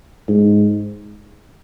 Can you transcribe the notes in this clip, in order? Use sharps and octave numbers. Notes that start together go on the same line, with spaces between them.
G#2